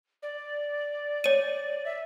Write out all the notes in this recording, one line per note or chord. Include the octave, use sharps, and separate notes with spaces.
D5
C#5 D#7
E5